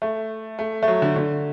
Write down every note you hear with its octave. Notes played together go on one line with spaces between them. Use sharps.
A3
A3
A3
F#3
D3
D3